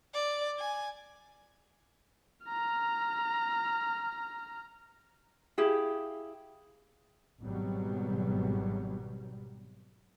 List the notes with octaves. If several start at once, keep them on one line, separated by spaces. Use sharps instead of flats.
D5
G#5
A#5 F6
E4 G4 G#4 F5
G#1 B2 F#3 G3